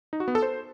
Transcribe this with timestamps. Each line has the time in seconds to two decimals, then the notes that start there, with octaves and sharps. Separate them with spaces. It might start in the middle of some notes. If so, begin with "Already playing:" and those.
0.13 D#4
0.20 F#4
0.28 B3
0.35 A4
0.42 C5